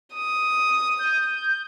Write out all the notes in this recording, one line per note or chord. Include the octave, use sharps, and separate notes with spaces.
D#6
G6